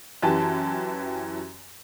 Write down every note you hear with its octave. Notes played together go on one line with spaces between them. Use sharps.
F#2 E3 G4 A5